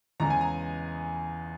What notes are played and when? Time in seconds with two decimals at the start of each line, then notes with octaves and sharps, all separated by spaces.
0.20 E2 C#3 G#3 A#5
0.30 G#5
0.41 A#5